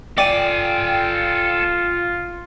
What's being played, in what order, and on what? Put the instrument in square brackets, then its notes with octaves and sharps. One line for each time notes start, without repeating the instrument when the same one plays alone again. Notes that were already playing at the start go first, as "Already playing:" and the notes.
[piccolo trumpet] F4 [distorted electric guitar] A4 G#5 [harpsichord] D5 [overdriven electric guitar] G5